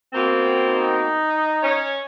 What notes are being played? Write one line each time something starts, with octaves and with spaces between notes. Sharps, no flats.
B2 A#3 C4
D#4
C#4 C#5